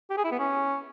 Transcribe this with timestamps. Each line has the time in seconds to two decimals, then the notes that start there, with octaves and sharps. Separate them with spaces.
0.10 G4
0.17 G#4
0.24 E4
0.32 B3
0.39 C#4